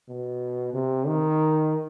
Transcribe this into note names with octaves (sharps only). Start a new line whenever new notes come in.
B2
C3
D#3